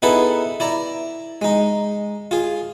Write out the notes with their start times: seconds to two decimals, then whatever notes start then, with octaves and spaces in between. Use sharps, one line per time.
0.02 B3 D#4 E4 G#4 A4 B4
0.60 E4 D5 A#5
1.42 G#3 D#4
2.31 F4 G#4